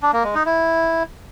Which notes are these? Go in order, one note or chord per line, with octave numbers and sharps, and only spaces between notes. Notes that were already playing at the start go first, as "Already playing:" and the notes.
D4
A#3
G#3
D#4
E4